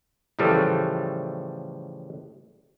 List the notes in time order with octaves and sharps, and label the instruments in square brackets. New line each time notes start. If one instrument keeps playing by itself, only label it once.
[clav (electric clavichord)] A2 C#3 E3 F3 G3 A3